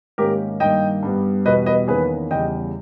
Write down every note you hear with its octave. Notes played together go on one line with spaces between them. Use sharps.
G#2 D#3 A#3 C#4 G4 A#4
G2 D#3 A#3 D#5 G5
G2 G3 B3
E2 B2 G3 B4 D#5
B4 D#5
E2 D#3 A#3 C#4 G#4 B4
E2 C#3 G3 D#5 G5